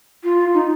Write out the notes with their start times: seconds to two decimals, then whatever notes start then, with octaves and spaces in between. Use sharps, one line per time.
0.24 F4
0.54 D#4